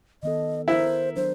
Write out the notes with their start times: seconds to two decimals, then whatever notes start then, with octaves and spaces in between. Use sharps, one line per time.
0.23 D#3 B3 A4 D#5
0.68 E4 A#4 C5
1.16 F#3 D4 C5